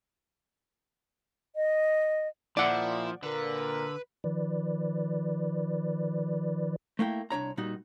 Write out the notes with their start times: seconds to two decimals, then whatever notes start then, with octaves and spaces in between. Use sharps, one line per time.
1.56 D#5
2.57 A#2 F3 E4 D5 E5 F#5
3.23 A#2 D3 A#4 B4
4.24 D#3 F3 B4 D5
6.99 A3 A#3 E4 G5
7.30 C2 D4 C#5 A#5
7.57 A#2 G3 D#4 F#4